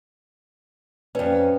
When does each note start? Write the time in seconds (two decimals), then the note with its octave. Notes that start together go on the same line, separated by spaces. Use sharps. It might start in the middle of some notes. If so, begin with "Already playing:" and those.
1.15 F2 C#4 B4 D5